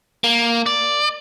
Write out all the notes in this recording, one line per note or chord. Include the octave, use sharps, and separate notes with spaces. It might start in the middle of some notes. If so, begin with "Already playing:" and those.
A#3
D5